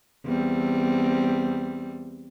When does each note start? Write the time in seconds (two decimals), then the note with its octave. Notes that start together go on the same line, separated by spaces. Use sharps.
0.24 E2 G3 C4